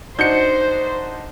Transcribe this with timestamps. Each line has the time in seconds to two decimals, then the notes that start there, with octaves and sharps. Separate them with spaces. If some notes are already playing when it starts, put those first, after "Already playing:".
0.19 D4 D#4 F#4 C5 G6 C#7